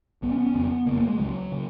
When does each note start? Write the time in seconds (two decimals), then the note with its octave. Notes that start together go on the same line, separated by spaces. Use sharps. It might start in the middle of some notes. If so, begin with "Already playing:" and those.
0.22 B1 B2 B3
0.31 C#4
0.38 B3
0.46 C#4
0.54 F1 F2 C#3 B3
0.86 F#1 F2 C#3 A#3
0.97 A#3
1.08 G#3
1.18 C#2 C#3 F#3
1.52 C#3